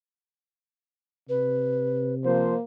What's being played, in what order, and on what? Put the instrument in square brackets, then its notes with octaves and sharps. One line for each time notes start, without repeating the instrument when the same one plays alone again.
[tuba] C3 [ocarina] B4
[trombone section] F3 C5 [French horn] A#3